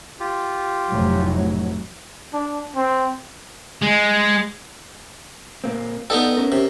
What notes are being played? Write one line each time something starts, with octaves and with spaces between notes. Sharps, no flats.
F4 G4
F1 A2 F#3
D4
C4
G#3
A#2 A#3 C4
B3 D#4 A4 B4 D5 G5
C#4 A#4
C3